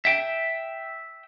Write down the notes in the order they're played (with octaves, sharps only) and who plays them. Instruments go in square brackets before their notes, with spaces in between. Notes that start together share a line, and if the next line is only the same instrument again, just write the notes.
[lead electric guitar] E5 G5